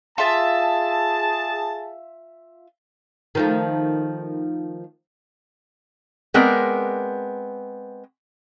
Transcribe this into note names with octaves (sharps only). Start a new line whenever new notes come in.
F4 G#4 E5 A5
D#3 F3 A3
G#3 B3 C4 A#4 D5